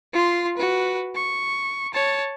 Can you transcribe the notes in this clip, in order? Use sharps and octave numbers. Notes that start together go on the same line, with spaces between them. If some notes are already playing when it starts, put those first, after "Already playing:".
F4 C6
F#4 B4
C#6
C#5 A5